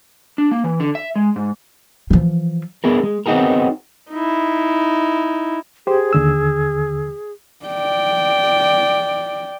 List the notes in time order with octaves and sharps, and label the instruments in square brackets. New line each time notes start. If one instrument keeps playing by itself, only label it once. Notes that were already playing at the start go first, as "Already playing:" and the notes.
[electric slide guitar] D4
A#3
E3
D3
E5
G#3
G#2
[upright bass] E3 F3
[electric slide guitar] B3 G#4 A#4
G#3
B3 C4 D#4 F#4 G#4 A#4
[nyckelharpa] D#4 E4
[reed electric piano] G4 C5 [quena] G#4
[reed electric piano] D#2 D3 E6
[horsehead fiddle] D5 G5